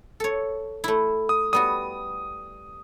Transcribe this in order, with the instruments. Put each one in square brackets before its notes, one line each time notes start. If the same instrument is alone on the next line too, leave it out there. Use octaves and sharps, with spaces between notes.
[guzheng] A4 C#5
A3 E4
[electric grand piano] D#6
[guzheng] G3 B3 F#4 [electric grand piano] D#6